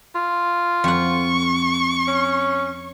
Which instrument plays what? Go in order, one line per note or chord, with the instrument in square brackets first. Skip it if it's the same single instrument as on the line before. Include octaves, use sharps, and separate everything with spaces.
[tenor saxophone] F4
[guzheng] F2 F#5 [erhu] C#6
[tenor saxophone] C#4